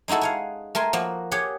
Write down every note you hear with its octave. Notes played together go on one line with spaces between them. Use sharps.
G#3 D#4 E4 F#4 A4
F5 F#5 G#5
A3 A#4 G#5 C6
F3 A#3 F#4
G4 G#4 C#5 F#5